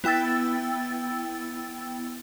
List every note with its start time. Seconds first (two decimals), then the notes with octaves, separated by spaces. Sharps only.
0.04 B3 E4 G5 E6 A6